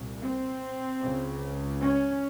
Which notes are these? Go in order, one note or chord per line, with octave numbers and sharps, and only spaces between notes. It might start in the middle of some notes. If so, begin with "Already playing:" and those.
Already playing: C2 A#2
C4
C#2 C#3
C#4